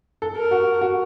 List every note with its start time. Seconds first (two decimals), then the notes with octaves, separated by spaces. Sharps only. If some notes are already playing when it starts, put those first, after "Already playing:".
0.22 A4
0.37 A#4
0.51 F#4
0.82 F#4